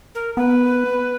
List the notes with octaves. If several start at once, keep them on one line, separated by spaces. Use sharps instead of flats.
A#4
B3 B4